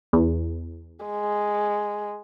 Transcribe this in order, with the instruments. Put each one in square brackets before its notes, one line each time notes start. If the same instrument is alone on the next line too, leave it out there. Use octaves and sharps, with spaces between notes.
[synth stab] E2
[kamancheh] G#3